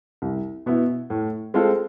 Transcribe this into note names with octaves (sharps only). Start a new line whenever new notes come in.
C2
B2 B3 E4
A2
G#3 C4 F4 A4